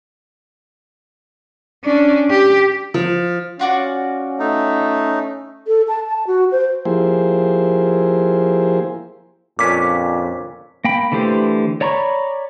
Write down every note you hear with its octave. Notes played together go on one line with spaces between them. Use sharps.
C#4 D4
G4
F3
C#4 F4 F#4 D5
A3 D#4
A4
A5
A5
F#4
C5
F3 A#3 E4 G4 G#4 C5
F2 A#2 C#4 D4 D6 B6
A#3 G5 B5
D3 E3 A3 G4 C5
C#5 D5 A#5 B5 C#6